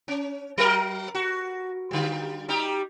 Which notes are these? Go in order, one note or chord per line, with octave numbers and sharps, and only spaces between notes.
C#4
F#3 A#4
F#4
D3 G3
G3 D#4 G4